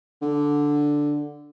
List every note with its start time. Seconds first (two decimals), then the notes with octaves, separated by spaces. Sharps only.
0.21 D3